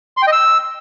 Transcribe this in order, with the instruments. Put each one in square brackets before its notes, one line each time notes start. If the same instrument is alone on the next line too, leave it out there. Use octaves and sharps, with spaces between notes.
[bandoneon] C6
G5
D#5
E6